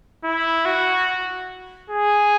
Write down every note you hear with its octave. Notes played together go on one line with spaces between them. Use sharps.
E4
F#4
G#4